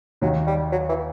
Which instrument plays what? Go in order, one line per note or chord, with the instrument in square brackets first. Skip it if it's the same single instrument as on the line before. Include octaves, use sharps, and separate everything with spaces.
[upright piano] D#2 D#3 [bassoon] F#3
[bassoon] G3
F#3
E3